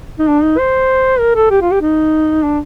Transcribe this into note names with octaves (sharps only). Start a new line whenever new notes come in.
D#4
D4
D#4
C5
A#4
A4
G4
F4
G4
D#4
D4